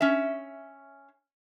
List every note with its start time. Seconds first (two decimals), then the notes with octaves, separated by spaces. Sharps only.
0.01 C#4 E5